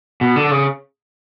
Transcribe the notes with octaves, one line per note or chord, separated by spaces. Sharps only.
B2
D3
C#3